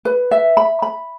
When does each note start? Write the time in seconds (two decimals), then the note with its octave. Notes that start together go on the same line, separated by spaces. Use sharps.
0.05 B4
0.31 E5
0.57 B5
0.82 B5